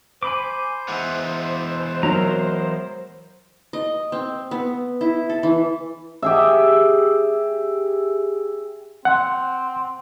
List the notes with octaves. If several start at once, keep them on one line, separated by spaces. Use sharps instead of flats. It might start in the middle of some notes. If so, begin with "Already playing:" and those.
C5 G#5 B5 D6
E3 G#3 B3
F#3 A#4 A#5
D#5
C4
B3
E4
A4
E3
G4 G#4 E5
C4 F#5